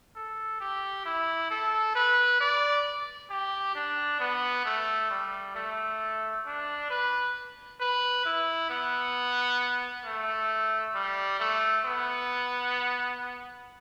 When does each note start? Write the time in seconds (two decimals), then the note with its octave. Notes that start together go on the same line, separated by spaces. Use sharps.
0.16 A4
0.60 G4
1.05 E4
1.51 A4
1.95 B4
2.41 D5
3.30 G4
3.75 D4
4.20 B3
4.65 A3
5.10 G3
5.56 A3
6.46 D4
6.90 B4
7.80 B4
8.25 E4
8.70 B3
10.05 A3
10.95 G3
11.40 A3
11.85 B3